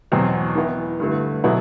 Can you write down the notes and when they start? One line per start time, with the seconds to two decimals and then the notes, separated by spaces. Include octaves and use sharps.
0.12 E2 B2 F#3 C4
0.55 E3 B3 E4
0.99 G2 D3 A3
1.44 B2 F#3 B3 E4